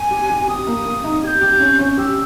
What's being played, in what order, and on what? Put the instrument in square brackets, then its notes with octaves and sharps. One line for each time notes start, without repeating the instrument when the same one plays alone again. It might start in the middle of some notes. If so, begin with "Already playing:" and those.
Already playing: [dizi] G#5
[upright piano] G4
G4
[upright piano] G4 [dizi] D#6
[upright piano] A#3
A#3
D#4
[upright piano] G4 [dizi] G#6
[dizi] G6
[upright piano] G4
C#4
C#4
[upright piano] G4 [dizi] E6